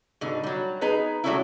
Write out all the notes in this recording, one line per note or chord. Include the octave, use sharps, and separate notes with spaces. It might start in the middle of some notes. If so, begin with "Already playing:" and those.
G#2 B2 D3
F#3 G3
B3 D#4 G#4 B4 A#5
F#3 G3 A3 C#4 D4 E4